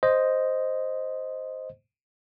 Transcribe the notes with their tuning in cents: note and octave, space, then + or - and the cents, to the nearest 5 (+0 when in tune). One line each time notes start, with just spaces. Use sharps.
C5 +0 D#5 +0